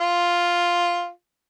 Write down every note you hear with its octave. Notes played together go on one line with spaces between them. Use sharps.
F4